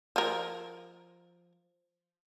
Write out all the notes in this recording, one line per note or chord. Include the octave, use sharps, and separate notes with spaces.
F3 A#4